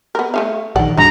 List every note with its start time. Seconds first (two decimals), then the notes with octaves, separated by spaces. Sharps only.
0.15 B3 A#4
0.34 A3 D#4 F5
0.76 A#1 D#3 D5 F#5
0.97 G2 D3 F#3 G#3 D#4 A#5